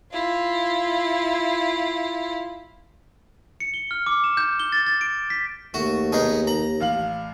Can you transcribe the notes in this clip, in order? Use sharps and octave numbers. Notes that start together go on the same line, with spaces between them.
E4 F4
C#7
G7
F6
D6
E7
G6
G7
A6
A6
D7
B6
D#2 A3 F#4
B3 D#4 G#4
A#5 F#7
A1 F5 F#7